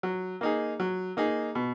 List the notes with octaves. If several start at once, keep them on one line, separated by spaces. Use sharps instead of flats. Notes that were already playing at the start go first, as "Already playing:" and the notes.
F#3
A#3 D#4 G#4
F#3
A#3 D#4 G#4
B2